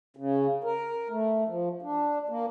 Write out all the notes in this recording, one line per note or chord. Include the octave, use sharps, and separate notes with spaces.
C#3
A#4
A3
F3
D4
A#3